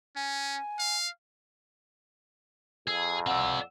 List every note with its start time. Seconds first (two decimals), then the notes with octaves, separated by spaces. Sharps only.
0.16 C#4 G#5
0.79 F5
2.88 F2 G#4 E6
3.27 C4 D5 F#5 E6